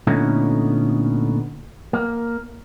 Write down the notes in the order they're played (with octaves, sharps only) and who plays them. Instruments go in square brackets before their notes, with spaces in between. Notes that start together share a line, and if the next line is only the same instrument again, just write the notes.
[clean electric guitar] A#2 D3 A3 B3 C#4 D#4
A#3